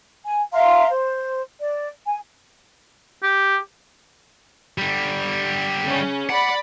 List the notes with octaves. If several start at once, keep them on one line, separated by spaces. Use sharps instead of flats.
G#5
E5 F5 A#5 C6
C5
D5
G#5
G4
D3 G3
C#3 C#4
D5 F#5 B5